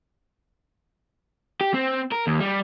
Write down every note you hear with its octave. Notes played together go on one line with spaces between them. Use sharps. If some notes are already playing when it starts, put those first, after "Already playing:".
G4
C4
A#4
D#2
G3